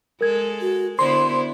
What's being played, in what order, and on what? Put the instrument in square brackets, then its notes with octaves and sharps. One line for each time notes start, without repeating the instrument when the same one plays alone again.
[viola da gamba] G#3 A4 [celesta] A#4 G#6
[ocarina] F#4
[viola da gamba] D3 B3 E4 [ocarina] C5 [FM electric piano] C6